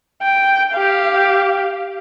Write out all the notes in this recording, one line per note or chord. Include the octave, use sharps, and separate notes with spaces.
G5
G4 F5